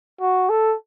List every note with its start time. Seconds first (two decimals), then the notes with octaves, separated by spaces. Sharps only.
0.21 F#4
0.49 A4